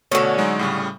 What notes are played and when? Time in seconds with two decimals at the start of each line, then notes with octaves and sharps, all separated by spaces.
0.12 B2 D3 A3 C#4 F#4
0.38 F#3 G#3 D#4
0.59 A2 C#3 G3